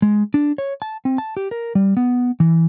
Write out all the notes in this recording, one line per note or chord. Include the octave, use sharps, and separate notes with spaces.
G#3
D4
C#5
A5
C4
A5
G4
A#4
G3
B3
E3